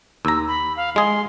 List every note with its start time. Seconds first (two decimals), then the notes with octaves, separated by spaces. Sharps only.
0.25 D#2 A#5 E6
0.47 B5
0.77 F5
0.96 G#3 G#4 C6